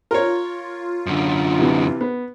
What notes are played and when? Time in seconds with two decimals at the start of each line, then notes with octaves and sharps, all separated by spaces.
0.11 F4 A#4 C#5
1.06 F#2 D3
1.59 C3 E3
2.01 B3